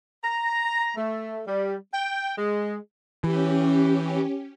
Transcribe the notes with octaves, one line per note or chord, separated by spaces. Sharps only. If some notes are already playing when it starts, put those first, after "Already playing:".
A#5
A3
G3
G5
G#3
E3 C#4 G4